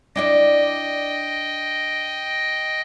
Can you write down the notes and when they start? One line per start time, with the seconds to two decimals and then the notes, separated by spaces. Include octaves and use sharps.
0.16 D4 E4 D5 D#5 G5